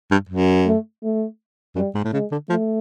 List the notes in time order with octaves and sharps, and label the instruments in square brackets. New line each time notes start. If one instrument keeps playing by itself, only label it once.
[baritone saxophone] G2
F#2
[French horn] A3
A3
[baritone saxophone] F#2 [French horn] G3
[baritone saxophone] G#2
A2
[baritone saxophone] C#3 [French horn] G#3
[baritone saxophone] D3
[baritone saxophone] F3 [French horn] A3